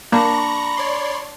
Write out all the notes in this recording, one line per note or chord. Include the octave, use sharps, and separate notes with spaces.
A#3 D4 A#5 B5 C#6 A#6
C#5 D5 C6